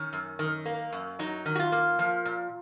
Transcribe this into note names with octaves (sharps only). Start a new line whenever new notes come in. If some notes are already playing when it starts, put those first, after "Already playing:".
Already playing: D#3 C#4
F#2
D#3
A#3
F#2
F#3 D#4
D#3
F#4
F4
A#3
F3
A#2